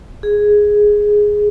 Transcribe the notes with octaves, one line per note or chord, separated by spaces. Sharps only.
G#4